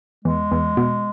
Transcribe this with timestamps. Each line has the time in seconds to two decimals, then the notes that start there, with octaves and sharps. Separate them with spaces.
0.25 E2 G#3
0.51 E2
0.77 B2